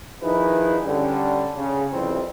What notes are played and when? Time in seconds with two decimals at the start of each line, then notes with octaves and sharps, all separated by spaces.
0.22 D#3 F3 D#4 E4 G#4 B4
0.85 D3 G3 C#4
1.55 C#3
1.92 F2 C3 E3 G3 C4